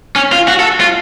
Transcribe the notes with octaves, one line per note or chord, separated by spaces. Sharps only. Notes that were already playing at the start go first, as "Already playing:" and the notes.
C#4
F4
F#4
A4
F4